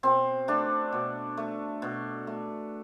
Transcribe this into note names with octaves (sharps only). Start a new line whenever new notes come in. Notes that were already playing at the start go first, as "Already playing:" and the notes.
B2 C4
A3 D4
B2
A3
B2
A3